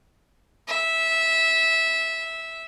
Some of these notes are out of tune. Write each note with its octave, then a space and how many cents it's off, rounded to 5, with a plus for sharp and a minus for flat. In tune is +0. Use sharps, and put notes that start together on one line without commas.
E5 -15